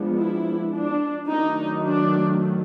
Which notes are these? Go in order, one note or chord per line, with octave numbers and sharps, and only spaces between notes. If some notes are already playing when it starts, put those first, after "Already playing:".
Already playing: F3 G#3 B3 D4
E4
D4
D#3 F#3 A3 D4 D#4
D4